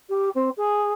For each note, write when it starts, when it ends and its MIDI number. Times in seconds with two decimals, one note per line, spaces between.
0.09 0.29 67
0.35 0.49 60
0.57 0.93 68